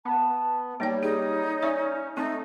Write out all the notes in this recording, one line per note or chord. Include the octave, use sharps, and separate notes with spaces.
B3 A5
G3 A#3 D#4 C#5 G5
D#4 G#4
C#4 D5 E5
A3 C4 D#4